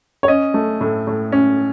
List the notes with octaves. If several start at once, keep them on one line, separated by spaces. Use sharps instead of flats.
C#5
C#4 D#5
A3
A2
A2
C#4